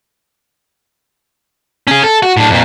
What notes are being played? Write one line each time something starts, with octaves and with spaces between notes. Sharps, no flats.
C#4 G#4
A4
F#4
A2 D4
F2 A#2